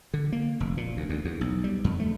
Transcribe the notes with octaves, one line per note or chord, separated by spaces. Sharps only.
D3
A#3
F1
A#2
D2
D2
E2
B1
G3
F2
A3